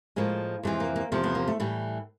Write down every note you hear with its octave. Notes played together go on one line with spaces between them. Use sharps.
A2 F3 G#3 A#3
F2 C3 E3 G#3 A3
A#3
A#3
E2 C3 F3 A3
A3 B3
A#3
A3
A2 E3 G3